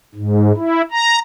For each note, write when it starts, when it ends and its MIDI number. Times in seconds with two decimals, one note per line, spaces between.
0.15 0.52 44
0.57 0.82 64
0.91 1.19 82